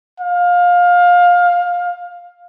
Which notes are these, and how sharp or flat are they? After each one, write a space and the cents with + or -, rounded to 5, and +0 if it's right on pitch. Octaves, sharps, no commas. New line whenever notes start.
F5 +20